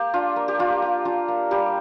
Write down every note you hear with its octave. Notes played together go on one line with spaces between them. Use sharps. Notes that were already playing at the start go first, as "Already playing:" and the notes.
Already playing: A#3 G4
D4 F4
A#3
G4
A#3 F4
F4
D4 F4
A#3
G3 G4